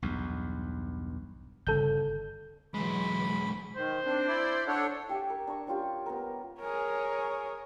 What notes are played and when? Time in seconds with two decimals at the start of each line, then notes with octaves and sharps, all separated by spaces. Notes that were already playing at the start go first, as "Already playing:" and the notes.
0.02 B1 E2 G2
1.67 G1 C#3 A4 G6
2.74 B1 E3 F#3 G#3 B5
3.76 D#3 C5
4.05 C4 D4
4.27 E4 D5
4.67 D4 A4 C#5 F#5
5.09 G4 E5 G5 G#5
5.30 A#4
5.47 D4 A#5 C#6
5.67 G3 C#4 F4 G4
6.06 B3 A#4
6.60 G#4 A#4 C#5